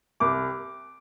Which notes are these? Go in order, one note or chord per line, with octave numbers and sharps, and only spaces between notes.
C2 D6